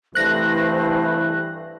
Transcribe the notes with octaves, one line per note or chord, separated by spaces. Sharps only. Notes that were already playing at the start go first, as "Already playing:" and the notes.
C2 G2 E3 A3 C5 F#6 A#6